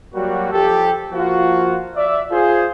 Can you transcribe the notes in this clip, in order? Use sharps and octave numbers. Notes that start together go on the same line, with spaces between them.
F#3 G3 A#3 F#4
F3 G4 A4
F3 A#3 F4 F#4
D5 E5
F4 G#4 C5